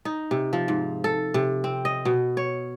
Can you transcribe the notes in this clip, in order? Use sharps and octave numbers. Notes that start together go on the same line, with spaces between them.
D#4
C3
F3
G#2
A4
C3
C4
D#5
B2
C#5